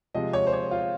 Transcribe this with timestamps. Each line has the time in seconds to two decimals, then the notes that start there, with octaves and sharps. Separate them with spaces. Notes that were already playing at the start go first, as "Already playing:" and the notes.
0.14 C3 F3 G#3 D#5
0.33 C#5
0.47 C5
0.53 C#5
0.71 F4